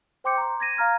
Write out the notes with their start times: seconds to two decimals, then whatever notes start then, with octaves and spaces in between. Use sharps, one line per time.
0.24 C5 G5 C6 D6 G6 C#7
0.37 A#5 C6
0.60 G#6 A#6 D#7
0.76 F5 A#5 F6 G#6 A#6